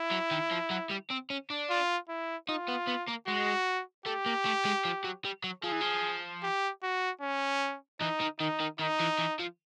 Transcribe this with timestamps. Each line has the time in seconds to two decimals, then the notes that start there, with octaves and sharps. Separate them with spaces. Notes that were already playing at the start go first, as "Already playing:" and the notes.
Already playing: E4
0.11 F#3
0.31 D#3
0.51 F3
0.71 F#3
0.91 G3
1.11 C4
1.30 C#4
1.50 D4
1.70 F4
2.09 E4
2.49 D#4 F4
2.68 B3
2.87 B3
3.08 A#3
3.27 G#3 F#4
4.06 A3 G4
4.26 A#3
4.45 A3
4.65 G#3
4.85 F3
5.04 F#3
5.25 G3
5.44 F#3
5.64 F3 G#4
5.72 E3
5.81 F3
6.43 G4
6.83 F#4
7.21 C#4
8.00 E3 D#4
8.20 D#3
8.39 D#3 D#4
8.60 D#3
8.79 D#3 D#4
9.00 E3
9.19 E3
9.39 F3